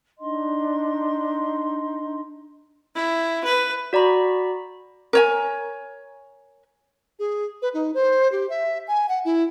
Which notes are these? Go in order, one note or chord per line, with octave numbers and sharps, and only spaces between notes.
D4 D#4 D#5 C6
E4
B4
F#4 D5 A#5 B5
A#4 C#5 G#5
G#4
B4
D#4
C5
G4
E5
G#5
F#5
E4